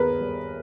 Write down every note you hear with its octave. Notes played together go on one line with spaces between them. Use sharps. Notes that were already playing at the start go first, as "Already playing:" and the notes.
Already playing: D#2 B3 G#4 A#4 B4
G3